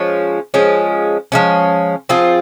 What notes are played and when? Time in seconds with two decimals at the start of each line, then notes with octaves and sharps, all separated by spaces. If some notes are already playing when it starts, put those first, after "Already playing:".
Already playing: F3 G#3 C#4
0.54 F3 G#3 C#4
1.32 F3 G#3 C#4
2.09 F3 C4 F4 G#4